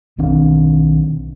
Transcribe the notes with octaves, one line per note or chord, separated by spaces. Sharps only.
B1 D#3 C4 D4